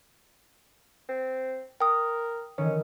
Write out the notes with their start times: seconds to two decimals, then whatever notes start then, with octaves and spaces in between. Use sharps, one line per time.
1.09 C4
1.80 A#4 G5 D#6
2.58 D#3 E3 C#4